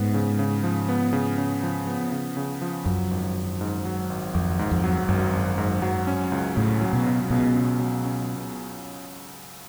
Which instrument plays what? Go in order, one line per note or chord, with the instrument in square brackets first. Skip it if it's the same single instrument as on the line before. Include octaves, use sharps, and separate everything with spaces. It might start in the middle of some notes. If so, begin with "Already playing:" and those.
Already playing: [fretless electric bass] G#2 [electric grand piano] B3
[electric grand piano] C#3
C#3
F3
B3
C#3
C#3
F3
B3
C#3
C#3
F3
[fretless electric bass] F#2 [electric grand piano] F#3
[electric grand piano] G#1
G#1
G#2
F#3
G#1
[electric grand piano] G#1 [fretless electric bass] F2
[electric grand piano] G#2
[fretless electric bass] F2
[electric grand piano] F#3
[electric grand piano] G#1 [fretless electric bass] F#2
[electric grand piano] G#1
G#2
F#3
C#4
C#2
[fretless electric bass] A2 [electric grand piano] C#3
[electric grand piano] F#3
[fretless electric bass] B2
[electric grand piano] C#4
[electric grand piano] C#2 [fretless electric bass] B2
[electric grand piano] C#3
F#3
C#4